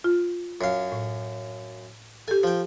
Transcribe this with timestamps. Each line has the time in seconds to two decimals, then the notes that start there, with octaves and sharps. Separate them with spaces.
0.04 F4
0.61 F#2 F5
0.92 A2
2.28 G4 A4 G#5
2.43 F3 G5